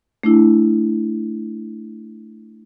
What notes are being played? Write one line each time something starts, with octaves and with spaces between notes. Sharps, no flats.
A3 D4 E4